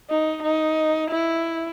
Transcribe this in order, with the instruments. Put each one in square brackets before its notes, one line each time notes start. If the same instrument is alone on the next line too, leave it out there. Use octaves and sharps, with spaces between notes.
[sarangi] D#4
D#4
E4